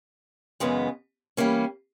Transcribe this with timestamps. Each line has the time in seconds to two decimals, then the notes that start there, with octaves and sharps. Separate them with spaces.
0.60 F#2 C#3 E3 G#3 B3
1.37 E3 G3 A#3 C#4